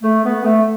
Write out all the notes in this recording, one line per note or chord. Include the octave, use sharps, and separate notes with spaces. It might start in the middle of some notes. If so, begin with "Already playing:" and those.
A3
B3
A3